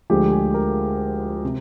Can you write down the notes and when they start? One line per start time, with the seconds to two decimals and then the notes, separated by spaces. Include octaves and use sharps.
0.10 D2 D3 F3 G#3 G4
0.32 G#4
0.54 A#4
1.44 C3